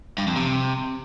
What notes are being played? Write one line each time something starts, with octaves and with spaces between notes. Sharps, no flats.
G2
F2
C3